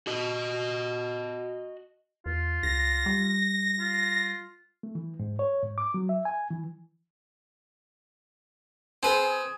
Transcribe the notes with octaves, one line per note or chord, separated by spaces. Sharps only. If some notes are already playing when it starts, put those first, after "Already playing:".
F#4 D#5
E2 F4
C#2 A#6
G3
F4
A3
E3
G#2
C#5
G#2
D6
F#3
E5
G#5
E3
C4 G#4 B4